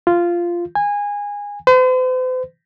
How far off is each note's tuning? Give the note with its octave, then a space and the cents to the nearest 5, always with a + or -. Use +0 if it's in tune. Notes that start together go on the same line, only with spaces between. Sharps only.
F4 -10
G#5 -20
C5 -45